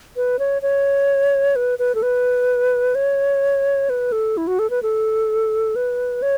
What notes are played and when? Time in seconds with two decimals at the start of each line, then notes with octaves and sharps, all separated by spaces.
0.16 B4
0.39 C#5
0.62 C#5
1.56 B4
1.79 B4
1.95 A4
2.03 B4
2.95 C#5
3.90 B4
4.12 A4
4.37 E4
4.47 F#4
4.59 A4
4.70 B4
4.83 A4
5.76 B4
6.22 C#5